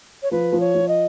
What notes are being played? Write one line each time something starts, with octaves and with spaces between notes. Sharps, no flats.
C#5
F3 B4
F3
C#5
F3
D#5